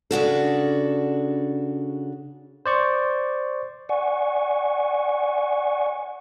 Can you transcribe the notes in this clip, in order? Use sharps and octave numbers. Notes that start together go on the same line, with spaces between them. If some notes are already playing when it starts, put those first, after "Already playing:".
C#3 D4 F#4 A4
C5 D5 C#6
D5 F#5 G#5 C#6